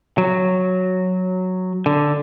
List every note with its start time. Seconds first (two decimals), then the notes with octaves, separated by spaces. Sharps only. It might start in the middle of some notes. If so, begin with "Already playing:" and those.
0.18 F#3
1.86 D3